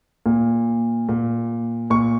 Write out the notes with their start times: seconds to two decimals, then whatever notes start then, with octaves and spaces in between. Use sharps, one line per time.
0.26 A#2
1.09 A#2
1.90 A#2 C#6